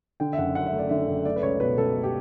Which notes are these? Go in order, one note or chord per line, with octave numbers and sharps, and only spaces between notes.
D3 G5
E5
F#1 F#5
F#2 F#5
E5
A3
D5
D3 E5
F#1
A3 D5
B4
C#2 C#5
B2 B4
C#2 A4
A3
G4